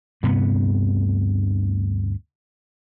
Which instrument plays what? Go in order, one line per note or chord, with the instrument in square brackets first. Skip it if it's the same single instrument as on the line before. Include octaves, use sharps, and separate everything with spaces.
[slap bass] D2 G2 C3 B3